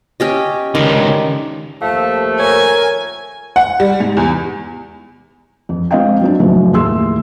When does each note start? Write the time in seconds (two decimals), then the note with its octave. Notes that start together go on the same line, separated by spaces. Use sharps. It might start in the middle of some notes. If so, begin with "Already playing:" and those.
0.20 C#4 G4 D#5
0.75 C#2 D3 D#3
1.82 D#2 F3 A3 F5 A5
2.40 A#4 C#5 G#5
3.56 F#5
3.80 G3
4.00 G#2
4.17 E2
5.69 F2
5.91 G#3 C4 F4 D#5 F5 G5
6.21 F#3 C4 D4
6.40 F#1 F#2 A2 D#3 F3 F#3
6.73 D#2 A2 G#4 C6 E6